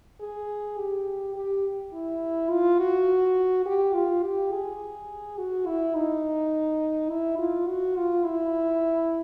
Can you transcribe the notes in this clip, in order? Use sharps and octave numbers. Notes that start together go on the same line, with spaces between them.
G#4
G4
G4
E4
F4
F#4
G4
F4
G4
G#4
F#4
E4
D#4
E4
F4
F#4
F4
E4